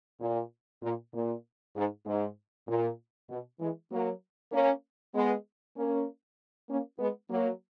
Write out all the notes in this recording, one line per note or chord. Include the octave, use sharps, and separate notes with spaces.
A#2
A#2
A#2
G#2
G#2
A#2
B2
E3 G#3
F#3 A#3
A#3 C#4
G#3 B3
A#3 C#4
A#3 C#4
G#3 B3
F#3 A#3